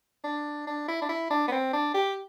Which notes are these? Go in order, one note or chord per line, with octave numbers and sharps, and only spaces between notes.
D4
D4
E4
D4
E4
D4
B3
C4
D4
G4